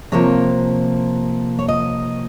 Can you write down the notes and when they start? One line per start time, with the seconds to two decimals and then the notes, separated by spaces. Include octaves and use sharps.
0.12 C3 F3 A#3 C#5
1.59 C#5
1.68 D#5